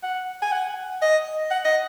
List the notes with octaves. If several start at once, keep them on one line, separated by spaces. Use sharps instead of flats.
F#5
G#5
F#5
D#5
F#5
D#5